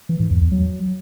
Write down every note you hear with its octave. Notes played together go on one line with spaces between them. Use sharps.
E3
G#2
E2
E2
F#3